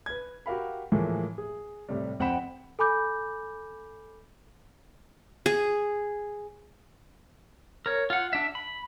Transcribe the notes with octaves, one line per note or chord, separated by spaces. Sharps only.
B4 G#6
F#4 G4 A#4 F5 B5
A2 E3 F3 G#3 A#3
G#4
A2 C3 G3
F2 C4 F#5 G5 B5 E7
A4 G#5 B5 D6 G6
G#4
A#4 C#5
F4 F#5
D4 E5
B5